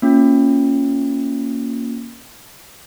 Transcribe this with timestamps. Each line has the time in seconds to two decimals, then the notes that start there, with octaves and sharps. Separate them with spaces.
0.02 A#3 C#4 F4